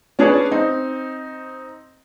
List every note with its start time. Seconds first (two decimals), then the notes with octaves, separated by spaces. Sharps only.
0.19 C#4 D4 G#4 B4 C#5 D5
0.51 C4 D#4